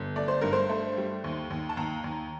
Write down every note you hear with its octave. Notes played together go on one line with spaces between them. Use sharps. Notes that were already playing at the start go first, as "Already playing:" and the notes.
Already playing: G1
A3 D5
C5
G2 A#4
C5
A3
G3
D#2
D#2
A5
D#2 A#5
D#2